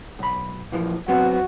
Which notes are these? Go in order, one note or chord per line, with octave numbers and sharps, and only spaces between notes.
B1 B5
A#2 E3 F3
F#3 B3 C4 F#4